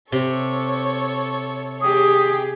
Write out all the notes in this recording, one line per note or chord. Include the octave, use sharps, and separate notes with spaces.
C3 A4 C#5
G4 G#4 D#6